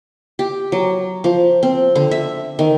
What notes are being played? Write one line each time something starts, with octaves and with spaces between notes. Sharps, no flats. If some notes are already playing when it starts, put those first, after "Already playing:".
G4
F#3
F3
C4
D3
E5
D#3